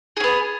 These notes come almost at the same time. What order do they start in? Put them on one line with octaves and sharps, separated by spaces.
G#4 C#4 B3